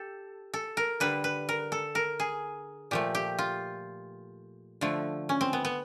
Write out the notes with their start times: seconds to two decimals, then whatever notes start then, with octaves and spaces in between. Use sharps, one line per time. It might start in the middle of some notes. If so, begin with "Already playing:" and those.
Already playing: G4 A4
0.54 A4
0.77 A#4
1.00 D3 G3 B4
1.24 B4
1.49 A#4
1.72 A4
1.95 A#4
2.20 G#4
2.91 A#2 F3 A3 G4
3.15 G4
3.39 F4
4.81 D3 F3 A3
5.29 C#4
5.41 C4
5.53 B3
5.65 B3